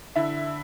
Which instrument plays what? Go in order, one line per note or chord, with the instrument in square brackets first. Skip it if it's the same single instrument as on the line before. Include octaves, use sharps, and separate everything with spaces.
[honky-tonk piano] D3 E4 E5